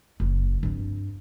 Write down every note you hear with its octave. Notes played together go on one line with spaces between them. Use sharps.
F#1
G2 C4